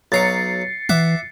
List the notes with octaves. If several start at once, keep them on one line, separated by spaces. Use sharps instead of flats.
B1 F#3 A#5 A6 C7 C#7
E3 E5 F#5 D6